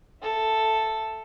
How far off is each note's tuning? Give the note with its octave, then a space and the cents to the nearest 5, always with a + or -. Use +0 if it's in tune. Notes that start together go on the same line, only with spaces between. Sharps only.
A4 +0 E5 +0